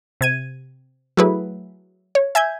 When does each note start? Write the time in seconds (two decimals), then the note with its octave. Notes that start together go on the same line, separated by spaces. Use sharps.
0.21 C3 G#6 D#7
1.17 F#3 A3 E4 G#4 B4
2.15 C#5
2.35 E5 G#5 G6 G#6